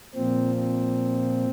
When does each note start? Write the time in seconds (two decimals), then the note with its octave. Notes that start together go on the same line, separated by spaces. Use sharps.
0.15 A#2 F3 C4
0.57 C4